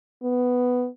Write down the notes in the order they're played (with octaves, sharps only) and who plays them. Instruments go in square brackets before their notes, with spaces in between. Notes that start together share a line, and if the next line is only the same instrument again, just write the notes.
[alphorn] B3